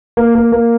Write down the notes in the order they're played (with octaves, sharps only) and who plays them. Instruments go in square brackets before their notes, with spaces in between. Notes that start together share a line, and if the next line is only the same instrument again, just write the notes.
[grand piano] A#3
A#3
A#3